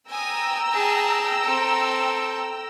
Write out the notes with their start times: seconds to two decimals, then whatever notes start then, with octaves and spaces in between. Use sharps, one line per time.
0.10 G5 G#5 A#5 D#6 E6
0.72 G#4 A5
1.44 C4 A4